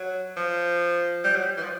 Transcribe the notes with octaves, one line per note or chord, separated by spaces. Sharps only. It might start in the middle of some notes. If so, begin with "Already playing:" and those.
Already playing: F#3
F3
G3
F#3
E3
F3